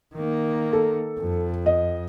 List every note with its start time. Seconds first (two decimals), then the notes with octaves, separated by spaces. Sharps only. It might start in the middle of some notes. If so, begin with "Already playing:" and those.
0.14 D#3 A#3
0.73 A4
1.18 F2
1.66 D#5